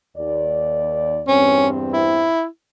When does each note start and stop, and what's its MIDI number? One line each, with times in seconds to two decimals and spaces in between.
0.17 1.21 39
0.17 1.21 74
1.28 2.33 40
1.28 2.33 43
1.28 2.33 60
1.28 1.68 61
1.93 2.46 64